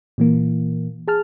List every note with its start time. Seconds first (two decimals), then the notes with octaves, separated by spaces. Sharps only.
0.18 A#2 E3 A#3
1.08 G#4 A5 F6